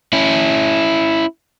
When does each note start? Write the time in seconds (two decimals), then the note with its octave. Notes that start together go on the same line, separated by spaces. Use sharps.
0.13 C#4 E4